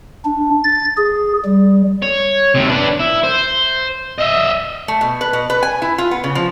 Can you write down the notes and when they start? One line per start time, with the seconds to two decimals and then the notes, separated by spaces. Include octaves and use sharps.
0.25 D4
0.64 A6
0.97 G#4
1.45 G3
2.02 C#5
2.55 D#2 C3
2.68 D4 B4
2.99 E4
3.23 C5
4.18 D#5 E5
4.88 A3
5.01 B2
5.21 B4
5.33 B2
5.50 B4
5.63 G#5
5.82 E4
5.98 F4
6.11 B3
6.24 C#3
6.35 F3